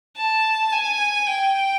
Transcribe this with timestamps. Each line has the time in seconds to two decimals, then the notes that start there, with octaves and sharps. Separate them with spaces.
0.17 A5
0.73 G#5
1.27 G5